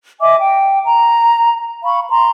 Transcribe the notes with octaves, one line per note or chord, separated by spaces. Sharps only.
D#5 E5 G#5 D6
G5
A#5
F5 B5 C#6
A#5 C6